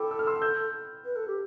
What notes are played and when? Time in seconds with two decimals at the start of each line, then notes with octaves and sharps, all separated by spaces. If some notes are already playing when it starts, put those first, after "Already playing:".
Already playing: A4 G5 B5 D6
0.11 E6
0.19 F6
0.27 C6 E6
0.42 E6 G6
1.05 B4
1.16 A4
1.28 G4